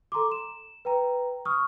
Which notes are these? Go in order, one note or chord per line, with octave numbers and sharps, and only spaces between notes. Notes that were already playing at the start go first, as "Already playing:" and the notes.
A4 A#5 C6 D6
E7
B4 G5 A#5
C#6 D#6 F6